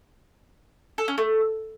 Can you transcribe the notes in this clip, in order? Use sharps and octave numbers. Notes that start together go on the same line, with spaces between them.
A4
C#4
A3